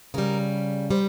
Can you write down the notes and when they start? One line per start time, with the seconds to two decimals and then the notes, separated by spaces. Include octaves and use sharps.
0.14 C#3 G3 A#4
0.91 G3 C5